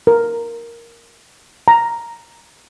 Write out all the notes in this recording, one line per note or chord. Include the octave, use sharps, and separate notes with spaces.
A#4
A#5